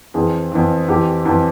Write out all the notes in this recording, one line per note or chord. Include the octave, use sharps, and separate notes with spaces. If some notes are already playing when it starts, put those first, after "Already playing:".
F2 E3 G#4
F2 E3
F2 E3 G4
F2 E3